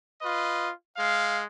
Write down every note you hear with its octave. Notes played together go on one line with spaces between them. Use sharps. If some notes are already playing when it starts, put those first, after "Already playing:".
F4 B4 D#5
G#3 F5